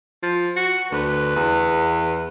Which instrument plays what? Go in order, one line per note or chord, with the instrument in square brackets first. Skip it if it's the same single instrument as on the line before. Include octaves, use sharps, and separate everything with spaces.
[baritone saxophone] F3
F#4
[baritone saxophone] D2 [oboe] B4
[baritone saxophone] E2